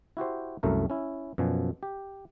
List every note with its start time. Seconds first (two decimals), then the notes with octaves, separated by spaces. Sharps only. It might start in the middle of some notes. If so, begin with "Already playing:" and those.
0.17 E4 F#4 G4 C5
0.63 C2 F#2 A3 A#4
0.90 C#4 E4
1.38 F#2 B2 F3 G#5
1.83 G4